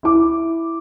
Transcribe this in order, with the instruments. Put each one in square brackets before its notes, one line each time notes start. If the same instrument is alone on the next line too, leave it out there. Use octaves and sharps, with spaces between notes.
[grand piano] E4 D6